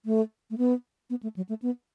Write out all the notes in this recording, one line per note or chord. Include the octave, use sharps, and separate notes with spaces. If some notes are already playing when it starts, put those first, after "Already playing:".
A3
A3
B3
B3
A3
F#3
A3
B3